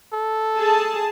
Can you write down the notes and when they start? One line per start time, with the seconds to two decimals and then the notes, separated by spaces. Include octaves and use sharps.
0.13 A4
0.58 G#4 A5